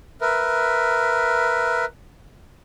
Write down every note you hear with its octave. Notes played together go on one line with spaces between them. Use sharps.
A#4 B4 E5